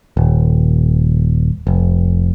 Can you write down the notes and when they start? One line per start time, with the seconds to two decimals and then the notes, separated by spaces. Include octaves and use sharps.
0.17 D#1
1.67 F1